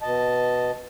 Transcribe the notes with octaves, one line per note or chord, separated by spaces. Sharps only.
B2 D#5 A5